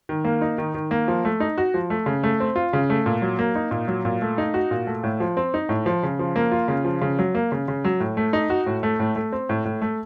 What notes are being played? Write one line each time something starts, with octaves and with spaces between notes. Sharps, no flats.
D#3
A#3
D#4
D#3
D#3
A#3
F3
A3
D#4
F#4
F3
A3
C#3
A3
C4
F4
C#3
A3
A#2
F#3
A#3
D#4
A#2
F#3
A#2
A3
D#4
F#4
A#2
A3
A2
F3
C4
D#4
A2
F3
C#3
F3
A#3
F4
C#3
F3
C#3
F#3
A#3
C#3
C#3
F#3
A2
A3
D#4
F#4
A2
A3
A2
A3
C4
A2
A2
A3